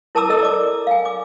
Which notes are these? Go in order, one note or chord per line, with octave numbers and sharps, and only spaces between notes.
E4 A#4 A5 A#5 D6 E6
A4 A#4 D#5 E6
D5 D6
F5 G#5
D6